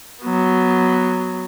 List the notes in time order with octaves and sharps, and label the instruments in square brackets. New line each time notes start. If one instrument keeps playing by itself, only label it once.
[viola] F#3 B3